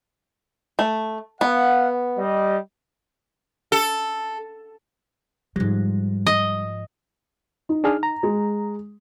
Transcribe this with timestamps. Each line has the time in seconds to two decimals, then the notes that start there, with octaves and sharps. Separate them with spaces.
0.79 A3
1.41 B3 F5 F#5
2.18 G3 D#5
3.72 A4
5.56 G#2 F3 G3
6.27 D#5
7.69 D#4
7.84 D4 G#4 F6
8.03 A#5
8.23 G#3